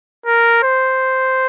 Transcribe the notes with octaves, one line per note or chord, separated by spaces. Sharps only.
A#4
C5